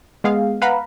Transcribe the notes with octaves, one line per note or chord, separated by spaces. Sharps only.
G#3 B3 G#4 F5
B4 F5 F#5 A#5 B5